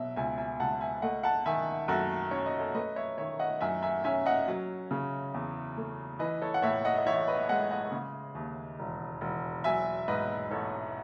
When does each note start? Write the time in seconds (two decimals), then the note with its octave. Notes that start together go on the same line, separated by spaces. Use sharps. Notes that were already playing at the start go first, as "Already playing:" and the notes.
Already playing: B2 F#3 E5
0.16 C#2 E5 G#5
0.38 E5 G#5
0.60 C#2 F#5 A5
0.81 E5 G#5
1.02 A3 D#5 F#5
1.23 F#5 A5
1.46 D#3 E5 G#5
1.88 F#2 F#4 A4
2.31 C#4 C#5
2.46 D#5
2.60 A4 C#5
2.74 A3 B4 D#5
2.96 C#5 E5
3.18 D#3 C#5 E5
3.39 D#5 F#5
3.61 F#2 E5 G#5
3.82 E5 G#5
4.04 C#4 E5 G#5
4.26 D#5 F#5
4.48 F#3
4.91 C#3
5.34 E2
5.77 A3
6.19 E3 B4 D#5
6.42 A4 C#5
6.54 F#5
6.62 A2 C#5 E5
6.85 D#5 F#5
6.98 D#5
7.06 A1 C#5 E5
7.28 B4 D#5
7.49 G#3 D#5 F#5
7.70 D#5 F#5
7.92 C#3
8.35 D#2
8.79 E1
9.21 E1
9.64 F#3 E5 G#5
10.08 G#2 B4 D#5
10.51 A1 A4 C#5